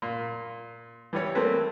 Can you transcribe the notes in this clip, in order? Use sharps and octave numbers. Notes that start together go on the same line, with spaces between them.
A#2
E3 G3 C#5
A3 A#3 C4 B4